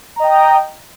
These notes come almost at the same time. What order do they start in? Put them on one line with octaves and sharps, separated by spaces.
A#5 D#5 G5